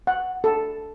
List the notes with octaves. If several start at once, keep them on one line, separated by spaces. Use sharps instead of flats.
F#5
A4